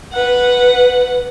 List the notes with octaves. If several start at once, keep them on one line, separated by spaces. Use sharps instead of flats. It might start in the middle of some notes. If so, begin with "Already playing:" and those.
B4 F#5